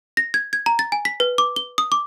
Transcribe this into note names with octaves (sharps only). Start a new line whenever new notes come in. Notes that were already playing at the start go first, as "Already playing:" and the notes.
A#6
G#6
G#6
A#5
A6
G#5
B6
B4
D6
G7
D#6
D6